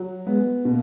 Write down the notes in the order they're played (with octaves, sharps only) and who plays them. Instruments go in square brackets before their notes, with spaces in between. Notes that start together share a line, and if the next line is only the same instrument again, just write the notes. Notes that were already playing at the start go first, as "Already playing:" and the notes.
Already playing: [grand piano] F#3
[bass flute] G#3 [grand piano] B3
[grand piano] B2 [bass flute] A#3